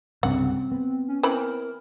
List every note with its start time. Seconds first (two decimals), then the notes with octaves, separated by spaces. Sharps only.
0.23 C2 G2 C#3 C4 F#5
0.72 B3
1.08 C#4
1.23 E3 C4 A#4 B5